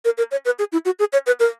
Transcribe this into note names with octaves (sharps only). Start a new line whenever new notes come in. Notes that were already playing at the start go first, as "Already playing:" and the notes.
A#4
A#4
C#5
B4
G#4
E4
F#4
G#4
C#5
B4
A#4